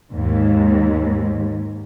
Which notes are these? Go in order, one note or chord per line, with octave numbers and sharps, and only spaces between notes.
D#2 G#2